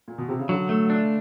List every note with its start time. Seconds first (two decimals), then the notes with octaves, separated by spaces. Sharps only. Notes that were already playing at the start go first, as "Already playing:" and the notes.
0.08 A#2
0.18 B2
0.29 C3
0.39 C#3
0.49 D3 F#3
0.69 A3
0.90 D4